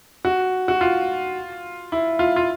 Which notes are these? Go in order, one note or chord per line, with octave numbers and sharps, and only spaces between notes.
F#4
F#4
F4
E4
F4
F4